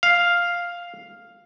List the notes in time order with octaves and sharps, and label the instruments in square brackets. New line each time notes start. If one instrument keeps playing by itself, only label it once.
[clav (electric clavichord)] F5